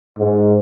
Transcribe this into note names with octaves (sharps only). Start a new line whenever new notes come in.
G#2